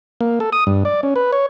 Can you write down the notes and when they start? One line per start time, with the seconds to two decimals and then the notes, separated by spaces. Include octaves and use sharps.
0.21 A#3
0.40 A4
0.52 D#6
0.67 G2
0.85 D5
1.03 C#4
1.16 B4
1.32 C#5